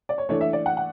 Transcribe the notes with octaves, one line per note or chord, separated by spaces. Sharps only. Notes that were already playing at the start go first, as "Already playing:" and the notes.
D5
C#5
E3 A3 D4 C#5
E5
D5
F#5
F#5